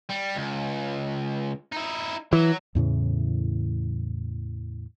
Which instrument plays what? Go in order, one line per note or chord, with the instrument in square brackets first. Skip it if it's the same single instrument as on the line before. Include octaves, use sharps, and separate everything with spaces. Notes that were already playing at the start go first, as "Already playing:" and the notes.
[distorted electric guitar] G3
C#2
D#4 E4
[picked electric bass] E3 [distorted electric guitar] F#3
[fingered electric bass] E2 A2 C#3 E3